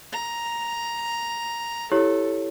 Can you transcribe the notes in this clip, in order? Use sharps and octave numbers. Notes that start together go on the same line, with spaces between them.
A#5
E4 G4 A4 C#5